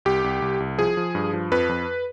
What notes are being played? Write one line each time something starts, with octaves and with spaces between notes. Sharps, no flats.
C2 G4
C2
C2
C2
F3 G#4
F3
G2
F3
F2 B4
F2